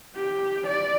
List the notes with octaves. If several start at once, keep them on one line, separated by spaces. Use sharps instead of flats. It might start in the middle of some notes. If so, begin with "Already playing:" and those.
G4
D5